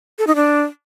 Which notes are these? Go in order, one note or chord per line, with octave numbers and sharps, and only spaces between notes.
A4
D#4
D4